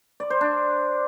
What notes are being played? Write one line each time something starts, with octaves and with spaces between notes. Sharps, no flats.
D5
C5
D4